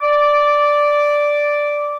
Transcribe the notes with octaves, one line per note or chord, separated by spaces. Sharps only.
D5 D6